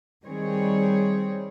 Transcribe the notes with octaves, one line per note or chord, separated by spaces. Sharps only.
D#3 G3 C4 G#4 C#5